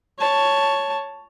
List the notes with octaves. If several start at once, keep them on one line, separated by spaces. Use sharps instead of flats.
C#5 A5